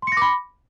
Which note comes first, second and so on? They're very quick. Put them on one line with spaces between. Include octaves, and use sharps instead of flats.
C6 C#7 A#6 D6 B5